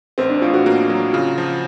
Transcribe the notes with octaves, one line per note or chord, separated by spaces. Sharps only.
A1 C4
D4
A2 F4
F#4
A#3 F#4
F#3
C#3 F4
F3